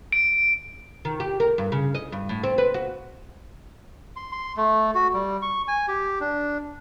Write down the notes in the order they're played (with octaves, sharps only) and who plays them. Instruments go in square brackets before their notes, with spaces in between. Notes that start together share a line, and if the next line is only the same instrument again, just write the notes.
[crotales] D7
[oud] D#3
G4
A#4
G2
C#3
D#5
G2
A2
C4
B4
F#4
[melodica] C6
C6
A3
F#4
G3
C#6
G#5
G4
D4